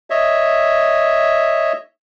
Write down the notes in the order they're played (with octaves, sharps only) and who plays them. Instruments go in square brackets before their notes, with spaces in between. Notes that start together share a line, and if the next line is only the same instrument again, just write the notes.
[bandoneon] C#5 D#5 E5